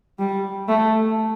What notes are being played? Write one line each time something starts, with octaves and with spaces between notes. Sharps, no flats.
G3
A3